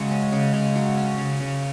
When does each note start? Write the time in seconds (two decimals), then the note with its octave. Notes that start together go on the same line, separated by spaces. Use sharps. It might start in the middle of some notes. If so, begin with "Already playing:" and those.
Already playing: C#3 F#3 G#3
0.11 C#4
0.32 C#3
0.54 C#3
0.75 F#3
0.97 C#4
1.18 C#3
1.40 C#3